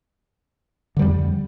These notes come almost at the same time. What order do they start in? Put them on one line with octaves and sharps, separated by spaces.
D3 G3 F2